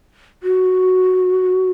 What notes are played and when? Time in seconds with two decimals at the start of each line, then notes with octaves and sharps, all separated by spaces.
0.43 F#4